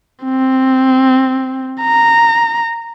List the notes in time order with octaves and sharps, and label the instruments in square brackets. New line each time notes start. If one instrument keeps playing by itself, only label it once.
[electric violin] C4
A#5